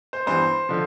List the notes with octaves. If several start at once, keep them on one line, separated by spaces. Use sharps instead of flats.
C5
G2 E3 B3 C5
D3 F3